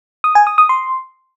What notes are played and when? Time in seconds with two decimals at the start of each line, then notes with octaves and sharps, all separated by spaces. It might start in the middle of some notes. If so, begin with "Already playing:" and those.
0.24 D#6
0.35 G#5
0.47 D#6
0.58 D#6
0.69 C6